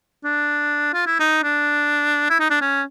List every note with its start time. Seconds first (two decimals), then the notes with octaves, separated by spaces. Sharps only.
0.24 D4
0.93 F4
1.06 E4
1.19 D#4
1.43 D4
2.30 E4
2.40 D#4
2.50 D4
2.61 C#4